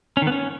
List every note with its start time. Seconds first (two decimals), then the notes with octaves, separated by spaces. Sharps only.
0.17 C#4
0.22 D#3
0.27 B3
0.32 C#4